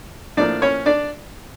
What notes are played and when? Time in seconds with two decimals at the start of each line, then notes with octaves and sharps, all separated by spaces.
0.37 A2 F3 A#3 D4 D5
0.62 C#4 C#5
0.86 D4 D5